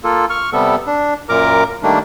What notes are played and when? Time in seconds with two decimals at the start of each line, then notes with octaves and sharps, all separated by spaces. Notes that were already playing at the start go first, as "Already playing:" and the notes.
0.04 A#3 F4 A4
0.30 C#6 F6
0.53 C3 G3 B3 A4
0.87 D4
1.29 F#2 A#2 A#4 A#5 D6
1.83 D#3 G3 A3 A#3 D4